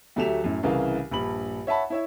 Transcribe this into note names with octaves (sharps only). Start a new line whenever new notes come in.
D2 F#3 A3 G4 E7 F7
F#2 A2
C2 C#3 E3 A#4 F5
A#1 G2 B5 F#7
C#5 E5 F#5 A5 B5
E4 C#5 E5